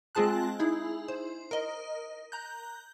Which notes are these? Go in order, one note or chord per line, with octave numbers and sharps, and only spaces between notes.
G#3 C4 F4 G#4 A5 F#6
D#4 E4 G#4
C5
A#4 D#5
A#5 F#6 G6